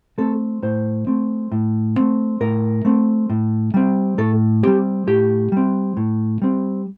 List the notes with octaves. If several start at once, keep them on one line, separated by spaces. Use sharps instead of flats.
A3 C4 A4
A2 C5
A3 C4
A2
A3 C4
A2 A#4
A3 C4
A2
G3 C4
A2 A4
G3 C4 G4
A2 G4
G3 C4
A2
G3 C4